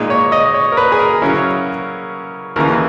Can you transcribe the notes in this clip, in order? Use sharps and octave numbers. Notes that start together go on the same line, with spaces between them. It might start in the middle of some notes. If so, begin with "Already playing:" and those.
Already playing: A#2 G#3 D#4
C#5
D#5
C#5
A#4
B4
G#4
A#4
C#3 F#3 C#4 E4
D#2 C#3 E3 A#4